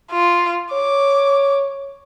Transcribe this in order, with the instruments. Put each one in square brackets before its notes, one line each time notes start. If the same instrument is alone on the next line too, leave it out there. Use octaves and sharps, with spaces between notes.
[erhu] F4
[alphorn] C#5 [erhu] D6